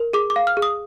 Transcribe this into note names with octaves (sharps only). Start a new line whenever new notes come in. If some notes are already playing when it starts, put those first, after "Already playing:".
Already playing: A#4
G#4 D6
D6
F5
F6
G#4
D#6